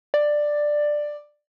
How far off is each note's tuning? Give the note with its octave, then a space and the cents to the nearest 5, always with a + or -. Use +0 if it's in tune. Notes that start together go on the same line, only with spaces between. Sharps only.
D5 +10